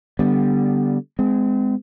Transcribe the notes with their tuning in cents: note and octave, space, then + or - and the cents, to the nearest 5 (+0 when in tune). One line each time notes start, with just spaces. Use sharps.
D3 -10 G3 -5 B3 +0
G#3 +0 C4 -35